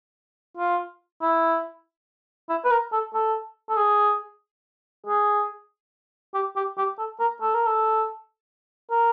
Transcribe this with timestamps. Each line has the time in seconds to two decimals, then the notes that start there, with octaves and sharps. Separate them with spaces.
0.57 F4
1.22 E4
2.49 E4
2.65 B4
2.71 A#4
2.92 A4
3.14 A4
3.69 A4
3.77 G#4
5.06 G#4
6.34 G4
6.56 G4
6.77 G4
6.98 A4
7.20 A#4
7.42 A4
7.54 A#4
7.67 A4
8.91 A#4